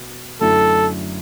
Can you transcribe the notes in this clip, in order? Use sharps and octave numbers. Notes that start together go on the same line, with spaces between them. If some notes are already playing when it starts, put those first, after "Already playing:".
Already playing: B2
F#2 D3 A3 E4 A4